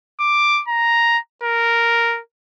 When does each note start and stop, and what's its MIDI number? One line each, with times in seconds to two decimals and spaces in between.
0.20 0.62 86
0.68 1.18 82
1.43 2.20 70